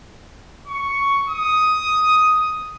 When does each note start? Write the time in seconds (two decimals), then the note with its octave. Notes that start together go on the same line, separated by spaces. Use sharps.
0.67 C#6
1.28 D#6